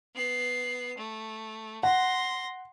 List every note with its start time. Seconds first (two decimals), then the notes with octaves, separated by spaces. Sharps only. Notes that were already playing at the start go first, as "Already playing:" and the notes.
0.15 B3 C7
0.98 A3
1.83 F#5 C6 A#6